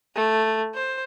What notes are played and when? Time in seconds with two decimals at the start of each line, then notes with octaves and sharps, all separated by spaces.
0.15 A3
0.74 C5